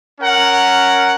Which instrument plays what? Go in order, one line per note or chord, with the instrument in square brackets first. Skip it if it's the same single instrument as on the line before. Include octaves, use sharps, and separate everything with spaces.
[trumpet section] C#4 A#4 F#5